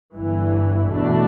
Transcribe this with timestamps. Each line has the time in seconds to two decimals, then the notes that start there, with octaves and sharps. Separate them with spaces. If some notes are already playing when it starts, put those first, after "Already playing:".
0.14 G1 G2 E3
0.90 E2 B2 A3 D4